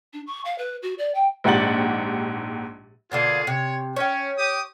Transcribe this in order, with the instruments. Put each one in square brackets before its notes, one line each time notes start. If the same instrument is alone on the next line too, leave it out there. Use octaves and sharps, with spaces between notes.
[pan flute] D4
C#6
F5
B4
F#4
D5
G5
[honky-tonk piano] A#1 G#2 G4 F#5 A6 F#7
[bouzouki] B2 D3 A#3 [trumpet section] F4 G#4
[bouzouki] C3 [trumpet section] C#5
[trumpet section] C#4 [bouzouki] C#5 G5
[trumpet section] G4 D#6